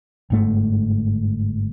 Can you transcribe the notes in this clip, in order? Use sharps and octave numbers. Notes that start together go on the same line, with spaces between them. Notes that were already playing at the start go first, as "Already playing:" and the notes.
G1 G#2 A3